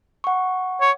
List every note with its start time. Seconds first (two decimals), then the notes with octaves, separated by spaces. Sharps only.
0.24 F#5 C#6
0.81 C#5